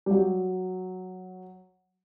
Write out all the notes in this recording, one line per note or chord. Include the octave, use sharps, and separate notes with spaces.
G3
F#3